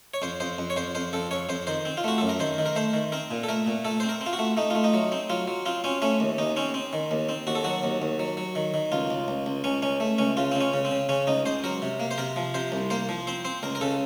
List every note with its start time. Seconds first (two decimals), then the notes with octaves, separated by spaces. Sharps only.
0.14 C#5
0.22 F2 C5
0.40 F2 C5
0.58 F2
0.70 C#5
0.76 F2 C5
0.95 F2 C5
1.13 F2 A4
1.31 F2 C#5
1.49 F2 C5
1.67 D#3 C5
1.85 C4
1.97 F4
2.04 A3 F#4
2.18 F#2 A4
2.29 A#4
2.40 D#3 C5
2.58 D#3
2.65 A#4
2.76 A3 C5
2.94 D#3
3.12 C4 A#4
3.31 A#2
3.44 A4
3.49 A3 A#4
3.67 A#2
3.85 A3 A4
4.00 C4 C5
4.09 A#4
4.21 C4
4.26 F4
4.33 F#4
4.39 A3
4.57 A3 D#4
4.70 A3 F4
4.84 D#4
4.94 F#3
5.12 C4
5.30 F#3 F4
5.47 F#3
5.66 C4 F4
5.84 C4 C#4
6.02 A3 C#4
6.20 D#2
6.38 D#2 D#4
6.56 C4 C#4
6.74 C4
6.93 D#3
7.11 D#2
7.29 C4
7.47 D#2 F#4
7.55 A4
7.64 F#3 F#4
7.83 D#2
8.02 D#2
8.20 F#3
8.37 F#3
8.55 D#3
8.74 D#3
8.92 C#2 F4
9.10 C#2
9.28 C#2
9.46 C#2
9.64 C#2 C#4
9.82 C#2 C#4
10.00 A3
10.18 C#2 C#4
10.37 C#3 F4
10.52 C#2 C4
10.61 C#4
10.73 C#3
10.85 C4
10.91 C#3
11.09 C#3 C#4
11.27 C#2 D#4
11.46 C#2 C5
11.64 F#3 A#4
11.82 C3
12.00 A#3
12.11 C5
12.18 C3 A#4
12.36 F3
12.54 C3 C5
12.72 C2
12.90 A#3 C5
13.09 F3
13.27 C4 C5
13.45 C4 C5
13.63 C#2 A#4
13.75 A#4
13.81 C#3 A4